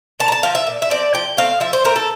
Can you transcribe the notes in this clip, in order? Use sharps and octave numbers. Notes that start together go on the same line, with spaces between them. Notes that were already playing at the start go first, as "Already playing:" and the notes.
A#2 A5
A#5
A5
F3 C4 F5
E5
A#2
E5
F3 C4 D5
F3 G5
A3 C4 F5
F3 E5
C5
A3 C4 A#4
A4